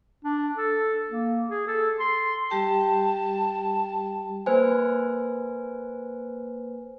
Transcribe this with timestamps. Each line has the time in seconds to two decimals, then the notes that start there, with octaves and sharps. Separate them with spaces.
0.24 D4
0.56 A4
1.10 A#3
1.50 G#4
1.68 A4
2.00 C6
2.50 G3 G4 G5 A5
4.46 A#3 B4 C5 G#5